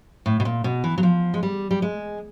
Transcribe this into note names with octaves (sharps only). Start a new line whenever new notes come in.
A2
B2
A#2
B2
E3
F#3
F3
G#3
G3
G3
G#3